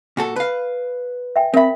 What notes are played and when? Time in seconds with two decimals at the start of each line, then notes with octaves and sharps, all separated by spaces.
0.17 A#2 F#4 A4
0.36 B4 F5
1.36 E5 G5 G#5
1.54 C4 A#4 E5 B5